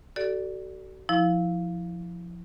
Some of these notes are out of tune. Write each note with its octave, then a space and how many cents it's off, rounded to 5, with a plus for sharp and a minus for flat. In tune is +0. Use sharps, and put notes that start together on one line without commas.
F#4 +40 A4 +0 D5 +0
F3 +0 E4 -15